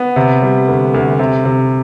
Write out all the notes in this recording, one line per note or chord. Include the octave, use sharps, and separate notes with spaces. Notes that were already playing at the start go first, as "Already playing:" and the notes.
Already playing: B3
C3
G3
D2
D2
C3
C3